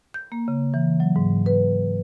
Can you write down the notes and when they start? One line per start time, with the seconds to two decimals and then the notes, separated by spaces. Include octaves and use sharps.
0.14 G6
0.32 A#3
0.48 C#3
0.74 E3
1.00 F#3
1.16 G#2
1.46 B4